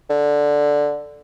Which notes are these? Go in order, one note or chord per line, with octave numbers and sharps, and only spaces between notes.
D3